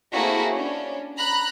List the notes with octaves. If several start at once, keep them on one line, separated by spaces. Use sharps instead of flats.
A3 A#3 C4 E4 F#4 G#4
C#4 D4
A#5 B5 F#6